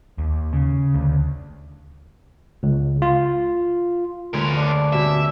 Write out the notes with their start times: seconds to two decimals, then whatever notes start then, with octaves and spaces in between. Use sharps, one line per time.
0.18 D#2
0.53 C#3
0.95 D2
2.63 C#2
3.02 F4
4.34 D2 G#3 F4 A#4 B4 C#5
4.57 D4 E5 F#5
4.93 B2 G3 C#4 E5